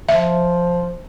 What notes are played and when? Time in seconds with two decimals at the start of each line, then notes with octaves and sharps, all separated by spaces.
0.09 F3 E5